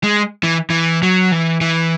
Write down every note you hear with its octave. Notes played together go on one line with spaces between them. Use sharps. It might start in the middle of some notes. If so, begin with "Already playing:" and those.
G#3
E3
E3
F#3
E3
E3